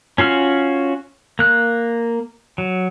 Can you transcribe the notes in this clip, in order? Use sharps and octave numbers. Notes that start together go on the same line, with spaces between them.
C#4 F4 F#4 F6
A#3 F#6
F#3